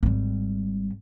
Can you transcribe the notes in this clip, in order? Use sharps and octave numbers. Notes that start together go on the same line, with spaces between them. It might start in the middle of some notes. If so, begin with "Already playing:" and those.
G#1 G3